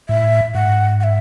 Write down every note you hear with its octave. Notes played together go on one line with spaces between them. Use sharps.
A2 E5
G#2 F#5
F#5
E5